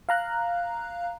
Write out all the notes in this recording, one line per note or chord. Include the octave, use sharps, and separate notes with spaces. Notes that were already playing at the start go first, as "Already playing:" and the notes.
F5 A#5 F#6